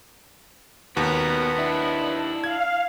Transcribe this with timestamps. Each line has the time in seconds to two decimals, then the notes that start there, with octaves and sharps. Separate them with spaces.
0.97 D#2 B2 B3 A#4
1.58 D4 E4
2.44 F5 G#6